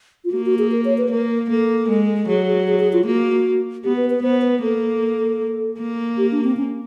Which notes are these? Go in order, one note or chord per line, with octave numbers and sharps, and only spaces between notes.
F4
A#3 F#4
F#4
G#4
A#4
C#5
B4
A#3 A#4
A#3 A4
G#3
F#3 G#4
G#4
G#4
G#4
F4
A#3 F#4
B3 G4
B4
B4
B3 C5
B4
A#3 A4
A#3
G4
D4
C4
C#4